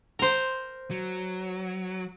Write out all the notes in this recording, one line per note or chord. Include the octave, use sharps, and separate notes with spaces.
A#4 C5
F#3